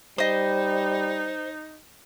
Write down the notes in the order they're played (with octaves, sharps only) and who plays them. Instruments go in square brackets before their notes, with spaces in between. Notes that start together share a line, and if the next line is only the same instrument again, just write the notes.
[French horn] G3 [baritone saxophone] D#4 [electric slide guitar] C5 [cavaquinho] D#5 D#6